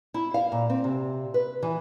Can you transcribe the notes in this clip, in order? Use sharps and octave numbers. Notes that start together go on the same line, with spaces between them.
E4
F5
A#2
C4
C3
B4
E3